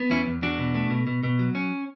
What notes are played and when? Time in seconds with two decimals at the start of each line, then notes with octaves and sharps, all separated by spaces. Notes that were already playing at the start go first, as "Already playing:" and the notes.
Already playing: B3
0.10 E2 C#4 E4
0.26 E2
0.42 E2 D4 F#4
0.59 B2
0.75 A3
0.90 B2
1.07 B2
1.23 B2
1.39 F#3
1.55 C#4